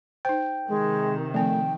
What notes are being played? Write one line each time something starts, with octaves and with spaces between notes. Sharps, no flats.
D#4 C5 G5
C3 D#3 G#3
F3 A3 C4 G5